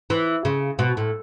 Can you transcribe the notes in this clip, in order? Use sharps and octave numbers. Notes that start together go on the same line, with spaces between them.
E3
C#3
B2
A2